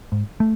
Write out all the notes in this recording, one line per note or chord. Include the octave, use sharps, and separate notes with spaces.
G#2
A3